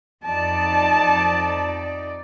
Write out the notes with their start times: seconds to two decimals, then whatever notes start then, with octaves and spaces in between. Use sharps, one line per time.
0.25 F2 D#4 D5 A5